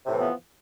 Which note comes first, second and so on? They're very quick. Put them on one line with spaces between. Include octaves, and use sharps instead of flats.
C3 A2 E3 B3 F3